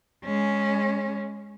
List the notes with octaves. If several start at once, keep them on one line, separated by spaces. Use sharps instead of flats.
G#3 C#4